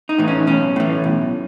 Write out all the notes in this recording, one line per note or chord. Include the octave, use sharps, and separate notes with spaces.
D#4
A2 E3
C#4
B1 C#4
A2 E3
B1